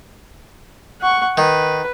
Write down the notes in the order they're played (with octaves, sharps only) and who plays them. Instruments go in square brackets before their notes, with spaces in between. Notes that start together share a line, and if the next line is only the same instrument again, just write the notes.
[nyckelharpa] F#5 C#6
[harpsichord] D#3 [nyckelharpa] B4